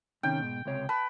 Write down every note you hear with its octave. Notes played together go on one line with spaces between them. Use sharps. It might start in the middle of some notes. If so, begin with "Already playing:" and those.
C3 D#3 C#4 G5
G#2 B2
C#2 C3 C#5
B4 A5